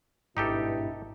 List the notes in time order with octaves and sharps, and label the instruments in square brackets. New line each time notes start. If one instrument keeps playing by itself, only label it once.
[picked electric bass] G#1 [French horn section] G2 B2 E4 [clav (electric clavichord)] D#4 G4 A4